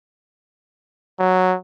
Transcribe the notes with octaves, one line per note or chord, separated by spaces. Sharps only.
F#3